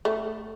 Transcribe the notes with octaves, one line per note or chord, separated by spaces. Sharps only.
A3